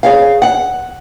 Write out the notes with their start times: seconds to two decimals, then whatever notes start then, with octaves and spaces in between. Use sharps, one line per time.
0.03 G#4 C#5 F5
0.42 F#5